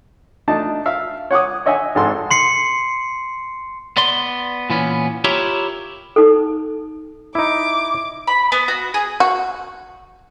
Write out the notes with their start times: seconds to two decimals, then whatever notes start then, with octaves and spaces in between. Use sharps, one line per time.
0.48 A3 D4 D#4 A5
0.86 E5 F5
1.31 C#5 F#5 D6 D#6
1.66 C#5 D#5 E5 F#5 G#5
1.95 G#1 G#2 A4 C6
2.31 C6 C7 C#7
3.97 B3 D5 C6
4.70 A#2 E3 B3 C#4
5.24 E4 F4 G4 A#4 C#5 E5
6.16 D#4 A4
7.35 D#4 E4 D6
8.27 B5
8.52 B3
8.68 F#4
8.94 G#4
9.20 F#4